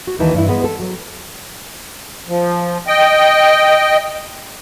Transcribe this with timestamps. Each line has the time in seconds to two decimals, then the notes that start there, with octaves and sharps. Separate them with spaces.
0.07 F#4
0.19 D#2 D#3 E3 E4 A5
0.34 G2 E3 E4
0.48 G#3 B3 B4
0.64 A4
0.80 F#3
2.28 F3
2.87 D#5 G5